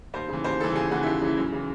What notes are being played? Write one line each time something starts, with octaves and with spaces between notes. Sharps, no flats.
D#2 C5
C#3 E3
D#2 C5
C#3 E3 A4
D#2 G#4
C#3 E3 F#4
D#2 E4
C#3 E3
E4
F#2
C#3 E3